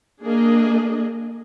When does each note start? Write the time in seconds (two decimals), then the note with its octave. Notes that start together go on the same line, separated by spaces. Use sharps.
0.22 A#3 D4 G#4 D#5